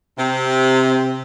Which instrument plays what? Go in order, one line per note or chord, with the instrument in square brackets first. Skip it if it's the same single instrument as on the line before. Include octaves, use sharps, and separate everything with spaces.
[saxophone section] C3